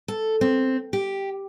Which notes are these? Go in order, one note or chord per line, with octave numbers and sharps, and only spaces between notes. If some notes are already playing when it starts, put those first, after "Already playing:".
A4
C4
G4